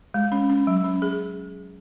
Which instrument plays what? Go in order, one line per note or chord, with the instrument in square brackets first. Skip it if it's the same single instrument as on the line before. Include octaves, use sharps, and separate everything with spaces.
[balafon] G#3
C#4
C#4
F#3
C#4
G#4